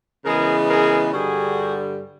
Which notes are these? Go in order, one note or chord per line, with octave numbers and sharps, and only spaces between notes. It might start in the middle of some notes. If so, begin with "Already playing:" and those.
C#3 E3 G#3 B3 G#4 A#4
G#4 A#4
G2 D3 G3 F#4 G#4